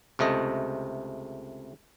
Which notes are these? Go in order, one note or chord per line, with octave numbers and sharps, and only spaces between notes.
C#2 C3 A3 D#5